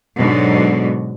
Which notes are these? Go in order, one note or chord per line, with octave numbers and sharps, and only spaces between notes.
G#2 B2 D3 F#3